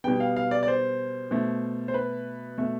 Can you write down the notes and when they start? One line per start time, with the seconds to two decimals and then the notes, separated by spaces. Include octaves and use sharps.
0.04 B2 G3 B3 G5
0.20 F5
0.36 F5
0.51 D5
0.63 D5
0.68 C5
1.31 B2 A3
1.88 C5
1.94 B4
2.58 B2 A3 E5